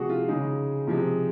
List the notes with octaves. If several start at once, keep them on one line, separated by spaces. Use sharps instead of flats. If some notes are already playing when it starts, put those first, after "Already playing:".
Already playing: C3 F3 G#3 F#4 G#4
F4
C#3 G#3 D#4
C3 F3 G#3